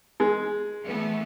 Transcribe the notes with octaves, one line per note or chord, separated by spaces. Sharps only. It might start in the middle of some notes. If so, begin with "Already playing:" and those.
G#3
E3 A3 B3